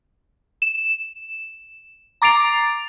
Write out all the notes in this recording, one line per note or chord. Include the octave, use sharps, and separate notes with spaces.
E7
A#5 D6 A6 C7 D7 F7